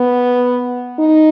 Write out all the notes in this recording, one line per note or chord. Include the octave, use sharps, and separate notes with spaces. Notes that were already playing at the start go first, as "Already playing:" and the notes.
Already playing: B3
D#4